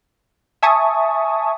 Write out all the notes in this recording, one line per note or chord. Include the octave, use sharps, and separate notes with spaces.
E5 G#5 A5 C#6 D#6